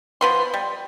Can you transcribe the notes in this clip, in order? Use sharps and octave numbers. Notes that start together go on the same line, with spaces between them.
F3 B3 C6
G3